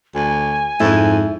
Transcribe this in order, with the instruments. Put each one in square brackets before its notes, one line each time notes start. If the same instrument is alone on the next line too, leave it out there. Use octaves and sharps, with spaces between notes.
[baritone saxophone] D2 [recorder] G#5
[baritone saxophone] F2 [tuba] G#2 [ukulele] E4